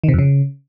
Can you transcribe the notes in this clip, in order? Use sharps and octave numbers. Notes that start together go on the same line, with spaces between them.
D#3
C3
F2
C#3